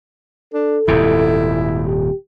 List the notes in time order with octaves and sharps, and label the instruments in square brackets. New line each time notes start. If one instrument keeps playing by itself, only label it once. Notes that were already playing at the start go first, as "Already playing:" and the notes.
[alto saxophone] D4 [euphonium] A4
[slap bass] D#1 G#2 C3 [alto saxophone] E4
[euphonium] G4